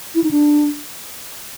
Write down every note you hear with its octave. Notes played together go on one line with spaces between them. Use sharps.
E4
D#4
D4